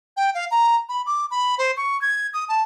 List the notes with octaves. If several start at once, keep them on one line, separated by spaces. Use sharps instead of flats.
G5
F5
A#5
B5
D6
B5
C5
C#6
G#6
D#6
A5